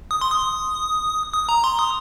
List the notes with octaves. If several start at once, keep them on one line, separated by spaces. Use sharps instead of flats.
D#6
C6
D#6
D#6
A#5
C6
D#6